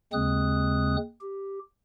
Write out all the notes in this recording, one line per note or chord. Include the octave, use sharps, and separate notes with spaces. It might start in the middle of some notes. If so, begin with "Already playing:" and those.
D#2 C#3 G#3 C4 D#6 F#6
G4